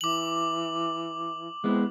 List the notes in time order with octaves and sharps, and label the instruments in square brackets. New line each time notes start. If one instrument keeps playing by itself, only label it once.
[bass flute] E3 [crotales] D6 F#7
[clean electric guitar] G#3 B3 E4 [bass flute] C4